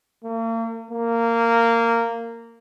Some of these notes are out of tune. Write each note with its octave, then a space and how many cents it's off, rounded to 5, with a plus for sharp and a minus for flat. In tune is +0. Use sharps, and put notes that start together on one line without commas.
A#3 -40
A#3 -15